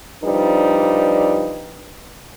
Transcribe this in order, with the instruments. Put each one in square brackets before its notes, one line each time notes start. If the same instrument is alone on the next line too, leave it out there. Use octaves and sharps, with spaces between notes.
[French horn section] F3 G3 D4 D#4 B4